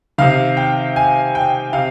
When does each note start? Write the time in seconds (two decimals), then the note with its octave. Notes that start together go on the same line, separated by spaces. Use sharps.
0.18 C3 D#3 F5
0.57 G5
0.96 G#5
1.35 G5
1.73 C3 F5